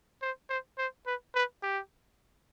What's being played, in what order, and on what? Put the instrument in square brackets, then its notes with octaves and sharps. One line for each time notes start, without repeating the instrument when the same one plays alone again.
[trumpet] C5
C5
C5
B4
B4
G4